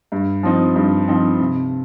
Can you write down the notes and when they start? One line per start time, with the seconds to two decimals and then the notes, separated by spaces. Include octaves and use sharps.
0.12 G2
0.43 F3 C4 D#4
0.76 G2
1.08 F3 C4 D#4
1.40 C3